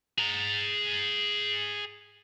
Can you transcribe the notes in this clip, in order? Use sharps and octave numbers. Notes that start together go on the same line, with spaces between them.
G#4 A#5